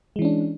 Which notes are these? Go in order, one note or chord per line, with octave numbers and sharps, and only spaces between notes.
E3 G#3 C#4 D4